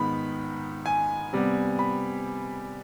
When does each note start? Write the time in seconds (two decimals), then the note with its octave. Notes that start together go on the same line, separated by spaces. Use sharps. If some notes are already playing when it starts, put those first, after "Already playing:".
Already playing: G#2 D#3 B3 B5
0.86 G#5
1.33 C3 G3 B3
1.79 B5